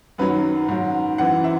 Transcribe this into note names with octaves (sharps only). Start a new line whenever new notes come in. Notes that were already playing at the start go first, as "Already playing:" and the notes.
F#2 D#3 F#3 B4
G#2 D#3 F#3
F#2 E3 F#5
E5